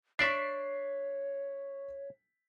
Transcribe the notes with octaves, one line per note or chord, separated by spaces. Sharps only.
D4 C#5 D5 E5 C#6 B6 C7